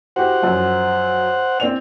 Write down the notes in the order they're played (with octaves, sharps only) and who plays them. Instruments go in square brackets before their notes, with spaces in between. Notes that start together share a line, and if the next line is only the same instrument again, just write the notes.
[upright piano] F#4 G4 [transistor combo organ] C5 F#5
[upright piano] F#2 F3
C4 D5 F7